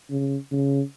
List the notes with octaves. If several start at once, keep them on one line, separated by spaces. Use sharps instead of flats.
C#3
C#3